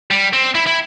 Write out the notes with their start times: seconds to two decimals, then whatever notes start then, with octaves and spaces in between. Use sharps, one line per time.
0.11 G3
0.33 C4
0.55 E4
0.67 E4